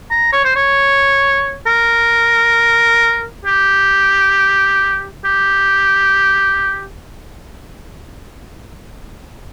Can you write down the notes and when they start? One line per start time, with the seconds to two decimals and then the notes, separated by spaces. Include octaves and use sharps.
0.11 A#5
0.32 C#5
0.45 C5
0.56 C#5
1.67 A#4
3.45 G4
5.25 G4